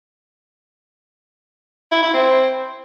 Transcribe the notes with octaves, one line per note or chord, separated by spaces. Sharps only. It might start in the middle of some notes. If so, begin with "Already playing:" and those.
E4
E4
C4